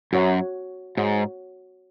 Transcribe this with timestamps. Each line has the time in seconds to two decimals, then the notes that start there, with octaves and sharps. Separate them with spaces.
0.13 F#2 F#4 C#5 F#5
0.97 G#2 F#4 C#5 F#5